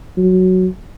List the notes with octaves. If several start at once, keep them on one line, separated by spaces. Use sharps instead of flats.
F#3